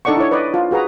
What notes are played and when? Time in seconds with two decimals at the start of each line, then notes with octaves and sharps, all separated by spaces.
0.05 D4 D#4 A4 D5 F#5 C#6
0.17 E4 C#5
0.31 B4 D5 D#5
0.54 F4
0.71 F#4 G#4 B4 A#5